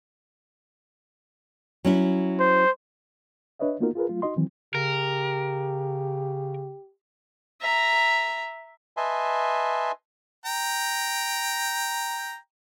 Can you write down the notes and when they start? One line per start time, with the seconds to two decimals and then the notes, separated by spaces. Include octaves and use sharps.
1.85 F#3 C#4 E4
2.40 C5
3.59 D4 B4 C#5 D#5 E5
3.80 A#3 B3 D#4 F4 F#4 A#4
3.95 F4 G#4 A#4 B4
4.09 F#3 A3 F4
4.22 D#4 F#4 D#5 C6
4.36 D#3 E3 F#3 C4
4.75 C#3 G4 A#4
7.62 E5 A#5
8.97 B4 D#5 E5 G#5 A5 C6
10.46 G5 A#5